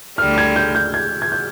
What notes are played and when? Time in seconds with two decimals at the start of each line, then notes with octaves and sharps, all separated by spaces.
0.18 D2 D3 G3 F6
0.38 G#6
0.56 G6
0.75 G6
0.94 G#6
1.22 G#6
1.32 G6